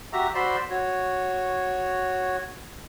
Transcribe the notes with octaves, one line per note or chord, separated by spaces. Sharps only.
F#4 G4 E5 A#5
F#4 C5 D5 B5 C6 E6
F#4 C#5